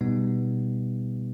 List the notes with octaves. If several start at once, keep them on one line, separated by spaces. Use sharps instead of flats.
B2 G3 B3 D#4